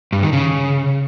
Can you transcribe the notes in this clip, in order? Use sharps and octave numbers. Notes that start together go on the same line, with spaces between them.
G2
D#3
C#3